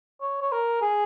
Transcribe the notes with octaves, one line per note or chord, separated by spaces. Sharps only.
C#5
C#5
A#4
G#4